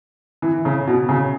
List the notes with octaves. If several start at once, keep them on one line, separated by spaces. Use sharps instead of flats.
E3
C#3
B2
C#3